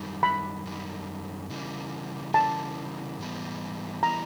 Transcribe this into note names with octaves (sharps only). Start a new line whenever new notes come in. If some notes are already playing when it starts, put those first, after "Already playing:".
Already playing: F#2 D#3 G3
B5
F#2 D#3 G3
C#3 E3 G3 A#3
C#3 E3 G3 A#3 A5
G#2 E3 G3 B3
E3 G3 B3 A#5